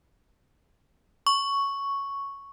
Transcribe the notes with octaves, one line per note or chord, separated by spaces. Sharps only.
C#6